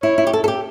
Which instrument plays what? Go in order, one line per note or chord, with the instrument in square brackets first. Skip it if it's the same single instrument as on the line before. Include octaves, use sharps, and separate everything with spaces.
[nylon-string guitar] E4 [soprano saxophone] C#5
[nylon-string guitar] E4
G4
A4
A4
G4